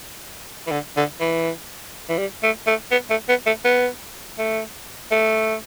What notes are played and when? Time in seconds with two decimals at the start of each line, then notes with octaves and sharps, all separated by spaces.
0.67 E3
0.71 D3
0.96 D3
1.20 E3
2.09 E3
2.18 G3
2.43 A3
2.67 A3
2.91 B3
3.10 A3
3.29 B3
3.46 A3
3.65 B3
4.39 A3
5.11 A3